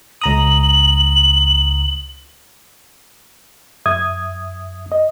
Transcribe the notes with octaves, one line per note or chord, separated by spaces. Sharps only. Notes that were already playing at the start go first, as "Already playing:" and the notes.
C#2 A#5 D#6 F#7
F#2 E5 D#6 G#6
D#5